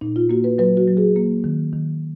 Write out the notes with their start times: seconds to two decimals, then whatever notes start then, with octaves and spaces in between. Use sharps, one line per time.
0.01 A#2 D#4
0.16 F4
0.29 A#3 F#4
0.44 B4
0.58 F#3 B4
0.77 F#4
0.88 F#3
0.97 G#4
1.16 A#3
1.44 D#3
1.73 D#3